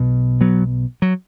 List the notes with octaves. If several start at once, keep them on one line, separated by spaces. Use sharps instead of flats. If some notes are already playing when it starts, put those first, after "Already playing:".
Already playing: B1 B2
F#3 B3
F#3